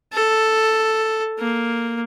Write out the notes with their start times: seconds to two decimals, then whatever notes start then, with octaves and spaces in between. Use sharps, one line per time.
0.13 A4
1.39 A#3